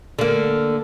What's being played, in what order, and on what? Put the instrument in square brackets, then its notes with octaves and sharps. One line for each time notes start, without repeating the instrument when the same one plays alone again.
[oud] D3 A#3